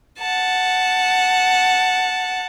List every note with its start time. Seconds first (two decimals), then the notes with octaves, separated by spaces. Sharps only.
0.19 F#5 A5